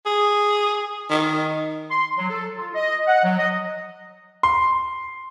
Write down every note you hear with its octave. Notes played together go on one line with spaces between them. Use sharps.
G#4
D#3
C6
F#3
A4
F4
D#5
F#5
F#3
D#5
C6